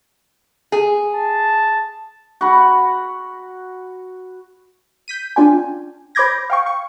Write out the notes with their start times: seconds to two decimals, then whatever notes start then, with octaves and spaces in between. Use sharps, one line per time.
0.72 G#4
1.15 A5
2.41 F#4 F#5 B5
5.08 G6 B6 D#7
5.36 C#4 D4 F4 D5 G5 G#5
6.15 C5 B5 D6 G6 G#6 A#6
6.50 F5 G5 C#6
6.66 C#6